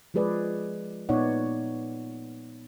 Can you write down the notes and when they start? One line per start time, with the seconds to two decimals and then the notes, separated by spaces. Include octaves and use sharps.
0.14 F3 G#3 G#4 B4 D5
1.09 A#2 B3 D#4 C#5 D5 F#5